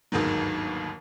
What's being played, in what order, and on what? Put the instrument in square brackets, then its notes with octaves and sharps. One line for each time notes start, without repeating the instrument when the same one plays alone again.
[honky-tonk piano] G1 D#2 G#2 D#3 F#3